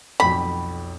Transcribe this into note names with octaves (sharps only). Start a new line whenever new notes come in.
B1 F2 G5 B5